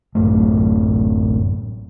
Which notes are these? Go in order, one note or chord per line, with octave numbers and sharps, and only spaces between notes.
A1 F#2 A2 A3